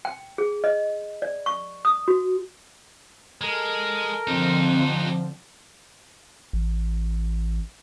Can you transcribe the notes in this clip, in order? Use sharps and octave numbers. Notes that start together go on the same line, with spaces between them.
G5
G#4
D#5
D5
C#6
D#6
F#4
G#3 A4 A#4
F2 D3 F3 C4 D#4 G4
A1